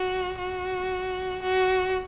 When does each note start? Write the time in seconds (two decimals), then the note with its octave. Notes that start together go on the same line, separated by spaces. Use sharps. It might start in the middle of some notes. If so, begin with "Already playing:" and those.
Already playing: F#4
0.38 F#4
1.43 F#4